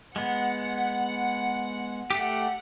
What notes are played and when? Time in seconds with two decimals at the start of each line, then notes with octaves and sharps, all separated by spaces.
0.16 G#3 B3 F#5
2.10 A3 G4 F#5